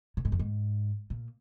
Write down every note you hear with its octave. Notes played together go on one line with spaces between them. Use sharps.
A#2
G#2
F2
G#2
A#2